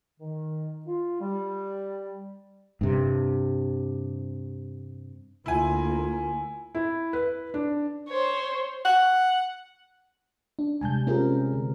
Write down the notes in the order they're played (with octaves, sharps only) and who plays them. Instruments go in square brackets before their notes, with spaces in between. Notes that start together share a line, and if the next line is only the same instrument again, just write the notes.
[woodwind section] D#3
F4
G3
[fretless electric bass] G2 C3
[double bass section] D2 A#3 [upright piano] E4 G#5 [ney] F4
[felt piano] E4
B4
D4
[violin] C5 C#5
[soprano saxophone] F#5
[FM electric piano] D4
[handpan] C3 G3 G#3 [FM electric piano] G#5 A5 G6
[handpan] C4 A#4 [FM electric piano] C#4 F4 G#4
[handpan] D3